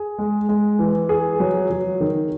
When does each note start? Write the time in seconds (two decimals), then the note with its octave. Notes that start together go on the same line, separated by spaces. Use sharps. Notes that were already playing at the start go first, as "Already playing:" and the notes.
Already playing: G#4
0.18 G#3
0.49 G#3
0.79 E3
1.09 G#4
1.40 F#3
1.70 F#3
2.01 D#3